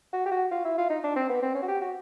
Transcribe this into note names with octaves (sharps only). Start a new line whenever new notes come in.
F#4
G4
F#4
F4
E4
F4
D#4
D4
C4
B3
C4
C#4
F#4
G4
F#4